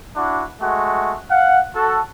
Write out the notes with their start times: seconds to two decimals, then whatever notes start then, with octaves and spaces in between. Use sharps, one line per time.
0.16 D4 E4 F#4
0.61 G#3 A3 F#4
1.31 F5 F#5
1.75 F#4 A4